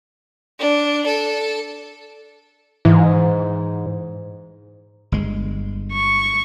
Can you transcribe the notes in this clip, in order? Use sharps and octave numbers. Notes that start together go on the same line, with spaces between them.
D4
A4
G#2 E3
G1 G#3
C#6